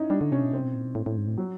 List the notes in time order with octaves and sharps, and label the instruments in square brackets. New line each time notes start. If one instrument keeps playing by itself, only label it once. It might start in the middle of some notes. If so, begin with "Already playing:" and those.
Already playing: [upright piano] C#4 D#4 E4
[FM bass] G3 [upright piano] D4
[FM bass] D3
[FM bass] C3 [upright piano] C#4
[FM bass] B2
[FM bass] C3 [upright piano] C4
[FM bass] B2
A#2
B2
A2
A2
G#2
A2
[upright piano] F#3